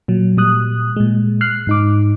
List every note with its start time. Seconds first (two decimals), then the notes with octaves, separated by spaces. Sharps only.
0.08 A#2 F#3
0.37 A#2 G3 D#6 F#6
0.96 A#2 G#3
1.41 F6 F#6 C7
1.67 G#2 D#4 D6